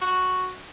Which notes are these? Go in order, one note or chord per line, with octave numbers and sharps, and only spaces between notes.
F#4